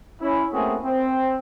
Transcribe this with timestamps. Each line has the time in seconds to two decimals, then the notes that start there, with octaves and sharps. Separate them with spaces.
0.22 C#4 E4
0.53 A3 A#3 C4 C#4 F#4 G#4
0.84 C4